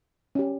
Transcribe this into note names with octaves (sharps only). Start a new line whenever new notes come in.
C#4 G4